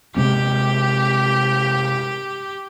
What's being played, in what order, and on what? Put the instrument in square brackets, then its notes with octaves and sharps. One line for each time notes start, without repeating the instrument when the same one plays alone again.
[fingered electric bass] C3 G#3 C4 [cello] G4